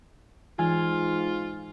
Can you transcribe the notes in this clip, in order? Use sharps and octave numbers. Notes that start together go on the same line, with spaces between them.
G#2 E3 F4 G#5